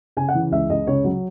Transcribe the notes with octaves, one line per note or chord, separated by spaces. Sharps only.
C#3 G#5
F#5
E3
C#2 E5
C#2 D#5
C#3 C#5
F#3